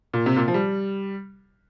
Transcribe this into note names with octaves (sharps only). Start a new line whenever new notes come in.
A#2
C3
A#2
F3
G3